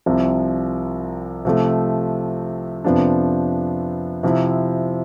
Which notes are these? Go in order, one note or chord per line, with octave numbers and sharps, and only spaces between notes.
C2 C3 F3
C3 F3 A3
F2 C3 F3 B3 D4
C3 F3 C4 E4